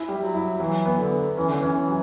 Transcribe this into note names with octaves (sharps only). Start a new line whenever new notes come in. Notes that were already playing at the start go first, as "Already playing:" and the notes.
Already playing: E4
G3
F#3
E4
E3 F#3
B3
D3
B3
E3 C#4
D3
E3 C#4
E3
F#3